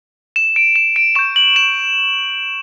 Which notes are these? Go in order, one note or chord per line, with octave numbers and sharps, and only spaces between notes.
E7
D7
E7
D7
C#6 G6 E7
F#7
E7